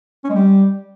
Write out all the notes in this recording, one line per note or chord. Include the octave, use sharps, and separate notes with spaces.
C#4
G#3
G3